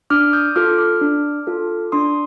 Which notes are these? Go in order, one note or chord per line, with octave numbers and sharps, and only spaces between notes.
D4 D6 F6
D#6 G6
F4 A4 D6 F6
D6 F6
D4
F4 A4
D4 C6 D#6